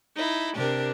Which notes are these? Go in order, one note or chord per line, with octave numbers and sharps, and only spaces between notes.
D#4 E4
C3 D4 G4 A#4